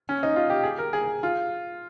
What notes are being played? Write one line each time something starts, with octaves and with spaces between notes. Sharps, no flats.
C#4
D#4
F4
G4
G#4
A#4
G#4
F4